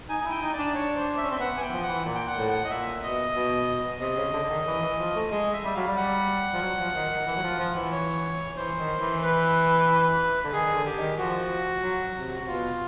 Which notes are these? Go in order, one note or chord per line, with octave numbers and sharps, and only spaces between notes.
D#4 G#5
D#4
E4
G5
D#4
D5
D4
C#5
C5
E5
C#4
C4
B3 F#5
B3 G#5
G5
E3
F3
F#5
E3
A#2
G5
F#5
A2
F#5
D#5
A#2 E5
B2 D#5
B2
C3 D#5
C#3
D3
D3
D#3
E3
E3
F3
A3
G#3 D#5
E5
G3 E5
F#3 F5
G3
F#5
F3
F#3
F3
D#3
D#3
E3
F#3
F3
F3
E3
C#5
E3 C5
D#3
E3
B4
D3
D#3 G#4
D#3
D3
G4
D#3
F3 F#4
F#3
C3
C3
B2 F4